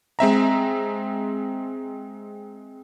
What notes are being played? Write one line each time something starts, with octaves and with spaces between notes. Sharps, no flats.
G#3 C4 E5 A#5